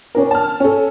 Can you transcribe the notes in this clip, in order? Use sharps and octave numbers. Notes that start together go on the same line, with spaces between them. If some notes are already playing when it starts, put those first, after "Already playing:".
C#4 D4 A#4
A5 F6
C#4 A4